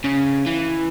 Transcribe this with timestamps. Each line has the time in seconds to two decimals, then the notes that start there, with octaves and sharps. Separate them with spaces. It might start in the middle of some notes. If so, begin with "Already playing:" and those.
0.04 C#3
0.46 E3